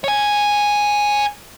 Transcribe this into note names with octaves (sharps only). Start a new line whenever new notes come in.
C#5 G#5